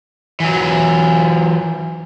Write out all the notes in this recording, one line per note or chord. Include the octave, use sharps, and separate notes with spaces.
E3 F#3